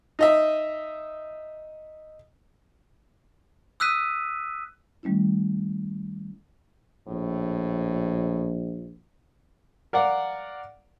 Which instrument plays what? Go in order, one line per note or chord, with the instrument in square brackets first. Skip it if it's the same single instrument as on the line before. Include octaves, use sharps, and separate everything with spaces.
[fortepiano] D#4 D#5 E5
[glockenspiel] D#6 E6 F#6 B6 D#7
[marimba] D#3 G3 A3 C#4 E4
[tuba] A#1 [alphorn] A2
[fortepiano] A#4 D5 F5 F#5